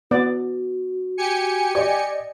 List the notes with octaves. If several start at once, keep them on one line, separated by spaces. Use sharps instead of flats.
B3 F#4 D5
G4 G#5 C#7
D5 D#5